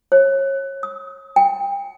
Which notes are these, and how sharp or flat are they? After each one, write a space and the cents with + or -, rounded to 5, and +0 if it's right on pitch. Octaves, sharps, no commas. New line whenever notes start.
C#5 -30
D#6 +30
G5 +25